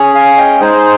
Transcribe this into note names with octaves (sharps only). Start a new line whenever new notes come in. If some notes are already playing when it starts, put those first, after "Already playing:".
Already playing: C#4 G#4
F5 G#5
D#5 G5
G#3 D#4 G#4 C5